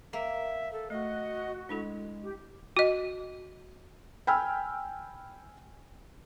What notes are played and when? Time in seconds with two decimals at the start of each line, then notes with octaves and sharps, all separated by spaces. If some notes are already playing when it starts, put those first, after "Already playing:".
0.13 A#3 E5
0.72 A4
0.90 A3 F#4 D#5
1.69 G#3 D4 E4 A4
2.23 G4
2.77 F#4 D#5
4.27 G5 G#5 B5 E6 F6